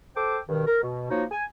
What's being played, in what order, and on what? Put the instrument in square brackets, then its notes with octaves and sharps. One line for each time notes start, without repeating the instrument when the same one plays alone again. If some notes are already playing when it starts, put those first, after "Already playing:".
[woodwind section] A4 C5 G5 D6
G2 B2 D#3
A#4
B2
F3 A#3 D#4 F#4 C#5
G#5